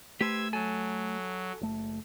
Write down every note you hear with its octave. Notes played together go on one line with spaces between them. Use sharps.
A3 G4 B4 C5 E6 G#6
F#3 A4 G#5
F#1 A3